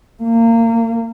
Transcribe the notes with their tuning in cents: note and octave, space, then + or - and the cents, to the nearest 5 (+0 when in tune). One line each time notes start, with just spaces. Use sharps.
A#3 -25